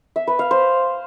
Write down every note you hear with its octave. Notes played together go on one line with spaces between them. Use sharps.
E5
B4
F5
C5